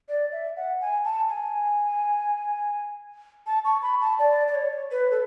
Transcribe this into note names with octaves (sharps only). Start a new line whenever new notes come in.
D5
E5
F#5
G#5
A5
G#5
A5
C#6
B5
A5
D5
D5
C#5
B4
A4